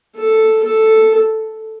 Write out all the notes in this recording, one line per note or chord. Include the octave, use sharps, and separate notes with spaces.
A4
A4